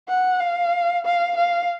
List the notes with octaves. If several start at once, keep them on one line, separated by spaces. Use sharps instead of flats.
F#5
F5
F5
F5